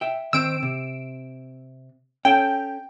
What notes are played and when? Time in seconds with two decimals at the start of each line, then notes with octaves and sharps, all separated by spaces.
0.01 E5 G5
0.33 D#3 C4 C5 E6 D7
0.63 C3
2.25 C#4 A4 G5